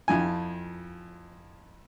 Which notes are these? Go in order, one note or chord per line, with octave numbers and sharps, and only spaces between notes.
F2 F3 E4 G#5